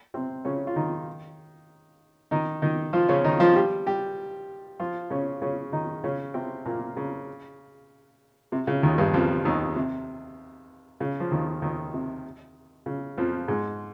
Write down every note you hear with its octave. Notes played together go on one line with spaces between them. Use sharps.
C3 C4
C#3 C#4
F4
D#3 D#4
D#3 D#4
D#3 D#4
F3 F4
C#3 C#4
D#3 D#4
F3 F4
G3 G4
G3 G4
F3 F4
C#3 C#4
C#3 C#4
D#3 D#4
C#3 C#4
C3 C4
A#2 A#3
C#3
C3
C#3
D#2 D#3
G2 G3
F2 F3
D#2 D#3
C3
C#3
F3
D#2 D#3
D#2 D#3
C3
C#3
F2 F3
G#2 G#3